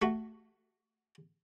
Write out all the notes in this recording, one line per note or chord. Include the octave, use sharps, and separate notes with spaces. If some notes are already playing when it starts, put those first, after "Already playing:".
A3 F#4